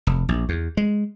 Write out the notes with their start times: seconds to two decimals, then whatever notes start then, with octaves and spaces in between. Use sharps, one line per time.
0.07 F1
0.29 A#1
0.49 E2
0.77 G#3